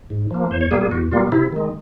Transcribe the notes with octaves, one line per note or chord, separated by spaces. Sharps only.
G#2
F3 A#3
E2 C5
C#5
B2 G3 A#3 G#4
G#4
E2 F#4
B2 G3 A#3 F4
C3 E4
D#3 G#3